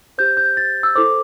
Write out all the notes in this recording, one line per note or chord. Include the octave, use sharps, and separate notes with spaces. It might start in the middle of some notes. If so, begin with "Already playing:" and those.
G4 C5 G6
G6
A6
E6
E4 A4 C5 D6